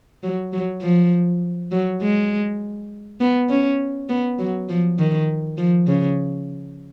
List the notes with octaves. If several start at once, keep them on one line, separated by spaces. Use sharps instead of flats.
F#3
F#3
F3
F#3
G#3
B3
C#4
B3
F#3
F3
D#3
F3
C#3